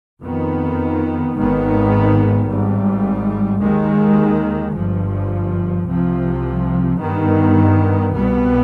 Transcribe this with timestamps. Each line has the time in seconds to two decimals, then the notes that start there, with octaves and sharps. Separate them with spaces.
0.22 F2 D#3 B3
1.35 G#1 G#2 D#3 G#3 B3
2.47 G#1 G#2 G3
3.61 D#2 D#3 G#3
4.74 G1 G2 F3
5.87 C2 C3 F3
7.00 G2 D#3 B3
8.14 C2 B2 G3 B3